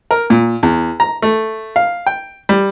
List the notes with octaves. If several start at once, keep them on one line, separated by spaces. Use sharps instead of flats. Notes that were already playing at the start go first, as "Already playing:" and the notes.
A#4
A#2
E2
A#5
A3
F5
G5
G3